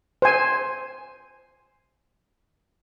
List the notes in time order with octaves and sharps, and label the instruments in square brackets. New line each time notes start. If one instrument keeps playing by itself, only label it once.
[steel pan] C5 G#5